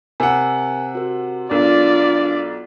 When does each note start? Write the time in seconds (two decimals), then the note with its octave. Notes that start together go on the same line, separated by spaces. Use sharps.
0.20 C3 A#4 F#5 G#5
0.95 F#4 A#4
1.51 B1 D4 F4 A#4 D5